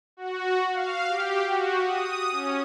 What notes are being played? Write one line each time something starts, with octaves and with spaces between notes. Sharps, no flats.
F#4
F5
G4
F#4
D#6
C#4